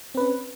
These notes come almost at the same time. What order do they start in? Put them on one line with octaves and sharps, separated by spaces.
C4 B4 C#4